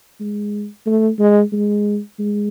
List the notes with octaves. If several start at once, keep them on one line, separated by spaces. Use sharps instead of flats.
G#3
A3
G#3
G#3
G#3